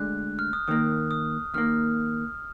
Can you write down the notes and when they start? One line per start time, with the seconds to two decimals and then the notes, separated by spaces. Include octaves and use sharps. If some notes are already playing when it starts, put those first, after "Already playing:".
Already playing: D2 D3 G#3 F#6
0.39 F6
0.53 D#6
0.68 D#2 D#3 A#3 D#6
1.11 D#6
1.54 D#2 D#3 A#3 F6